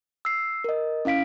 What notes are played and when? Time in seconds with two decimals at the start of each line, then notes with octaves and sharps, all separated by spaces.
0.25 E6 C7
0.64 A#4 D#5
1.05 C#4 E4 F5 B6 D7